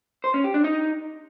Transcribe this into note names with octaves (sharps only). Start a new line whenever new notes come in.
C5
C#4
G4
D4
D#4